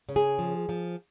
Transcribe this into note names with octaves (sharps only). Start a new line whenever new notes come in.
C#3
G#4
F3
F3